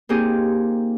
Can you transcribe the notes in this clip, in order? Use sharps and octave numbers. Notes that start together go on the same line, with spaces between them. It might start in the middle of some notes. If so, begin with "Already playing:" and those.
A#3 C4 D#4 F4 G4 G#4